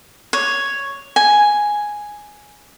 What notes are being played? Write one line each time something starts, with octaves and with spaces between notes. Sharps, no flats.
C#5
G#5